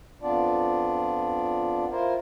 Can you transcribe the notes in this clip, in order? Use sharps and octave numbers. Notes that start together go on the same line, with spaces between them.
F2 B3 D4 F4 D5
E4 F4 A#4 C5